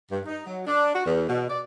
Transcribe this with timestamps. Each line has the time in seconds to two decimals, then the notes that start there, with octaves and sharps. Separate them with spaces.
0.11 G2
0.27 D#4
0.46 F#3
0.67 D4
0.95 F#4
1.06 E2
1.29 B2
1.50 D5